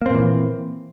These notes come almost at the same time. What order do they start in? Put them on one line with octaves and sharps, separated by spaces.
A#3 C4 A#2 E3